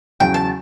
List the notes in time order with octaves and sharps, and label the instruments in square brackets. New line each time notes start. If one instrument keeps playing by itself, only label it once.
[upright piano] E2 C#3 F#3 [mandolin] G5
[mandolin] A5